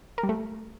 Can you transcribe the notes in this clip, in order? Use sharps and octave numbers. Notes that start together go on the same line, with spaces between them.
A#4
G3
A3